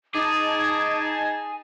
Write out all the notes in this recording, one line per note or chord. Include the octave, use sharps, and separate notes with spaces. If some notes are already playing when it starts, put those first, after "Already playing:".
D#4 G#4 A5 D6 G#6